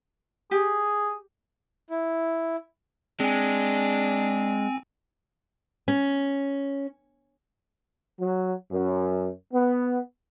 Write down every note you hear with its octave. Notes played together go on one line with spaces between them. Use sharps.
G4 G#4
E4
G#3 C4 D4 G#5
C#4
F#3
F#2
B3